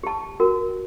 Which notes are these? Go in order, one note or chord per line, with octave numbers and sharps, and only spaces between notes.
G4 A5
F#4 A#4